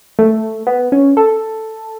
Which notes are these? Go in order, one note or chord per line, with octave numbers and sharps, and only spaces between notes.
A3
B3
C#4
A4